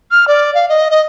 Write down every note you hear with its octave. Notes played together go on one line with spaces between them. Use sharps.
F6
D5
F5
D#5
D#5